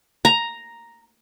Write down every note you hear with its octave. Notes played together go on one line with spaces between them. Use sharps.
A#5